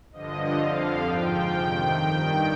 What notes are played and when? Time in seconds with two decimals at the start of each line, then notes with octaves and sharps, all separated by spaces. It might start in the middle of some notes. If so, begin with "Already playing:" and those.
0.12 G2 D3 F3 D#5
0.57 F2 D3 F3 F5
1.02 G#2 F3 G5
1.47 F2 C3 D#3
1.92 G2 D#3